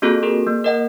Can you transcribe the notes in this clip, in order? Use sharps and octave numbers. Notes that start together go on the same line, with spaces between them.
A#3 C4 F4 F#4 G#4 A4
G#4 A#4
A#3
A#4 D#5 F#5